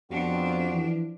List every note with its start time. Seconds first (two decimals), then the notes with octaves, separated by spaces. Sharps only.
0.11 F2 F3 B3 D4 F#4 G4
0.71 E3